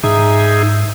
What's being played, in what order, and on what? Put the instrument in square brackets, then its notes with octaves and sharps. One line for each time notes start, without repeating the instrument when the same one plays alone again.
[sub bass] G#2 [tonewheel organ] D#4 G#4 [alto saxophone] E5